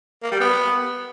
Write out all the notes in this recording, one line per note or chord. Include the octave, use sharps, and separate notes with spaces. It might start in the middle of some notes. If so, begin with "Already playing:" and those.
A#3
G3
B3